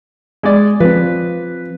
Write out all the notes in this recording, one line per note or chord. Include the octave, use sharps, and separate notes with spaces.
G#3 D5
F3 C4 B4